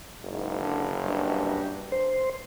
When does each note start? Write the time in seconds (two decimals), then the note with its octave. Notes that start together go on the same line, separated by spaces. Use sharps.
0.23 F#1 G#2
0.60 D3
0.98 G2
1.92 C5